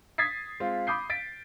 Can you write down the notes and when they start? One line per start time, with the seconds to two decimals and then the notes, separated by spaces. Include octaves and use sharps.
0.18 D#6 G#6 A6 B6 C7
0.60 G#3 C4 F4
0.87 B5 D6 D#6 G6 C7
1.10 A6 B6 D7